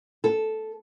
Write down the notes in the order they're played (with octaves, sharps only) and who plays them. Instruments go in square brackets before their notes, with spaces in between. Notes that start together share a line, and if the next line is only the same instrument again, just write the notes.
[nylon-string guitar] A4